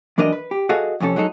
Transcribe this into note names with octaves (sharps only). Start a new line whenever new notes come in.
F#2 E3 D4 A#4 D5 D#5
B4
G4
F#4 G#4 A4 D#5 F5
F2 C3 C#4 F#4 A4
F#3 G#3 D#4 A4